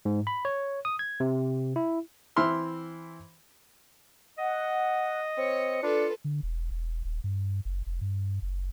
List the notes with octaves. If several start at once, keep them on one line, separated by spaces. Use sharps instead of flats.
G#2
B5
C#5
D#6
G#6
C3
E4
E3 C4 E4 E5 C6 F6
D#5 F#5
C4 C#5 C#7
D4 F4 A4 B4
D3
E1
E1
D#1
G2
F#1
F1
G2
F#1